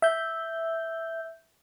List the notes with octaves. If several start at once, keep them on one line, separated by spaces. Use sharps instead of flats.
E5 G6